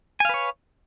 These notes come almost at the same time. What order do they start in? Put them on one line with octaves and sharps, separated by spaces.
G#5 F5 B4 C#5